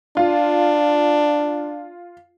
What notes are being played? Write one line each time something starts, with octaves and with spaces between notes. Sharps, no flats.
D4 F4